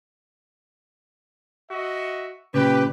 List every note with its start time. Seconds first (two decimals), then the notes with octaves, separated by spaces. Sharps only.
1.70 F#4 D#5 E5
2.54 A#2 C#3 G4 B4